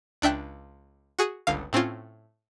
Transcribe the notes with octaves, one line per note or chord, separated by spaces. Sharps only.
C#2 D4 E5 G5 F#6
F#4 G#4 C#7 D#7
G1 C#2 D3 F5
A2 C4 C#4 F4